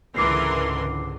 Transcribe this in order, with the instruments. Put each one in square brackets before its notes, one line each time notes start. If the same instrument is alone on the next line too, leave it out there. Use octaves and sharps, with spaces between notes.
[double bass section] C#2 G#2 D3 [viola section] E3 A#4 C6 [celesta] D6 C7